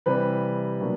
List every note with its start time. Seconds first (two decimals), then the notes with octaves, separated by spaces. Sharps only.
0.06 C3 E3 G3 C4 B4
0.81 B2 F#3 A#3 D4